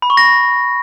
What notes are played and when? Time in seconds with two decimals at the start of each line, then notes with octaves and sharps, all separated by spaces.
0.02 B5
0.10 C#6
0.17 A#6